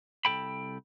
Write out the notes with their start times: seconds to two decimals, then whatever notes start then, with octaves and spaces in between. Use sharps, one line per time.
0.25 C2 F3 A4 G5 B5